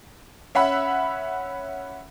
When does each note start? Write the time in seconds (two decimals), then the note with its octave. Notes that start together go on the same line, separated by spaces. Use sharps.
0.55 C#4 E5 F#5 B5